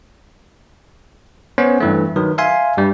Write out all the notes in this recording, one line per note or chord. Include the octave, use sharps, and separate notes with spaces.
B3 C#4 C5 C#5
G2 E3 A3
D#3 F#3 B4
E5 F5 G#5 C6
G2 G3